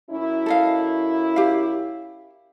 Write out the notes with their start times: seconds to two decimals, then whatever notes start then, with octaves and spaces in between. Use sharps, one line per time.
0.11 F#2 C#4 E4
0.46 A4 D#5 F5
1.36 G4 F5